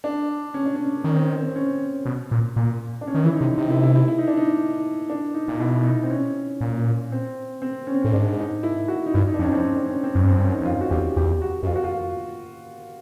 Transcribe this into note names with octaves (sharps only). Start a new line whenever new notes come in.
D4
C#4
D4
C#4
D#3 C#4
C4
C4
C#4
B2
A#2
A#2
D4
C#4
D#3
E3 E4
D#4
C3
C3 D#4
E4
E4
E4
E4
D#4
D4
D#4
D4
D#4
A#2
B2 E4
D#4
C4
C#4
A#2
C4
C4
C#4
C4
C#4
A2
G#2 D4
D#4
E4
F#4
D#4
G2 E4
D#4
D4
F2 C#4
C4
C#4
D4
C#4
C4
F#2 C#4
G2
C4
F#2
G2 C#4
F#2
D#4
E2
F2 F4
F#4
E2 G4
E2 G4
F#4
F#2
F2 F4
F#4
F4